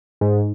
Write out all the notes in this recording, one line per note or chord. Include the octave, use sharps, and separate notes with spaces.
G#2